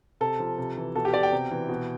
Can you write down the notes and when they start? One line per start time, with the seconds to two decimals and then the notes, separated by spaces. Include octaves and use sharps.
0.21 C3 A4
0.39 F3
0.58 C3
0.77 E3
0.96 B2 A4
1.05 G4
1.14 B2 D5
1.23 G5
1.32 C3
1.51 E3
1.69 B2